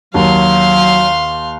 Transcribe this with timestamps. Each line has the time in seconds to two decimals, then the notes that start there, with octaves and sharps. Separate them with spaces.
0.14 D#2 F#3 F5 C6